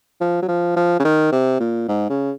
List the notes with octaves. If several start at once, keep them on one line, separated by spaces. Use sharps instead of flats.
F3
F#3
F3
F3
C#3
D#3
C3
A#2
G#2
C#3